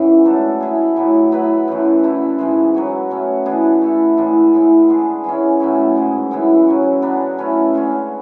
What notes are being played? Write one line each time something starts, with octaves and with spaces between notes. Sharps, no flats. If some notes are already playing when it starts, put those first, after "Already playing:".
Already playing: G#2 E3 B3 C#4 E4
F#3 A3 D4 A4
A3 E4 G#4
A2 F#3 B3
F#3 B3 E4 B4
F#2 E3 A3
D3 A3 E4
G#2 E3 G#3
F#3 B3 F#4
B2 A3 C#4 F#4
E3 B3 D4 G#4
A3 E4 A4
A2 E3 G#3 D4
A2 G#3 B3 E4
D3 G#3 D4 G#4
E3 G#3 C#4
A2 F#3 C#4 E4
G#2 G#3 B3
F#2 E3 B3 E4
F#3 C#4 F#4
C#3 F#3 B3 D4
A3 C#4 E4 B4
D3 G#3 C#4